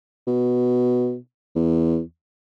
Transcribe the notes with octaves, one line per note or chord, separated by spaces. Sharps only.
B2
E2